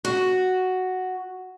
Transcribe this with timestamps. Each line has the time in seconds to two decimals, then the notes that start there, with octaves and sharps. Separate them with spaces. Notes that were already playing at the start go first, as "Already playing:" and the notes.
0.05 F#4